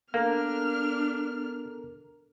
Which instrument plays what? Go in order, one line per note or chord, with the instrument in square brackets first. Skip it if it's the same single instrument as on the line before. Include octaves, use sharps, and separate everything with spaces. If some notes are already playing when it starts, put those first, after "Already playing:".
[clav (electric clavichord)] A#3 [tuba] B3 [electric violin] D4 F6 [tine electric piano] A4 A#4 A#5